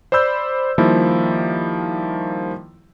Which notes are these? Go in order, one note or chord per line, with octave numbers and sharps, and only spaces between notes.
C5 D5 B5 E6 G6
D#3 F3 G3 A#3 E4